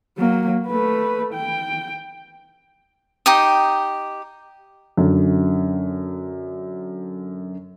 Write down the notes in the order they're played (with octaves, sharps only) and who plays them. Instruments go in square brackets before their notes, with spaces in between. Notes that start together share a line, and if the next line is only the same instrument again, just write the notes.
[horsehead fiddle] F#3 A#3
A3 B4
G5
[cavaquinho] D#4 G4 D#6
[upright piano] F#2 D3